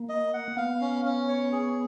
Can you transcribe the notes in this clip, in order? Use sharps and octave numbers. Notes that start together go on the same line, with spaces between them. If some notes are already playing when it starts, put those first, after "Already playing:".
Already playing: A#3
D#5
F#5
B3 F5
C#4
C#4
C#5
G#4